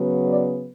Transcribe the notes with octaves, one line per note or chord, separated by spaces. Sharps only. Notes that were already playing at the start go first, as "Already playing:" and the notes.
Already playing: C#3 F#3 B3
D5